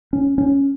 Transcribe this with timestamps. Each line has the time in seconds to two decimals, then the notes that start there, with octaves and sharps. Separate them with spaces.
0.13 C#4
0.38 C#4